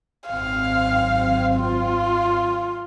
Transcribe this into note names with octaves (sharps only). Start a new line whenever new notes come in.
G#1 F#2 C4 F5
F4